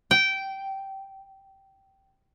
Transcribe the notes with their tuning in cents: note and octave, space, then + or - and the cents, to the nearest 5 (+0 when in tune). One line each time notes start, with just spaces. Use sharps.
G5 -15